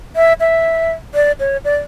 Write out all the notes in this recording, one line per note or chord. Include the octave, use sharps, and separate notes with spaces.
E5
E5
D5
C#5
D5